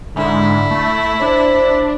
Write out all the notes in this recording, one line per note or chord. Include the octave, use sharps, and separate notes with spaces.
G#2 D3 E4
A3
D4 C5